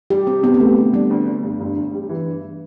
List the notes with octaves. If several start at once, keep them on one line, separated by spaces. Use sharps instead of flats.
G3 G4
C3 C4
C3 B3
B3
G3 A3
D3
G3 D4
D2
D3
G2
G1
G1
G3
E3
G2